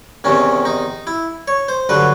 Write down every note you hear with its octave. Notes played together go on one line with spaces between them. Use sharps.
E2 C3 D#3 C#4
D#4
E4
C#5
C5
G2 D3 F#3 B4